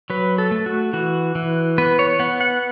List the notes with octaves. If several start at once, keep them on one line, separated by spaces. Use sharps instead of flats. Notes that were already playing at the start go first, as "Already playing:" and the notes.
F#3 B4
A4
A3
F#4
E3 F#4
E3
B3 B4
C#5
B3 F#5
F#5